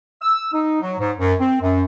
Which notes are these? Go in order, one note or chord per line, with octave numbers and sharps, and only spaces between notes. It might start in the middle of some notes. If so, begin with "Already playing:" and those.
E6
D#4
F#3
G#2
F#2
C4
F#2